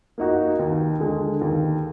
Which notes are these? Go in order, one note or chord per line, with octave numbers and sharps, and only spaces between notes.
A#3 D#4 F#4
D#2
D3 G#3
D#2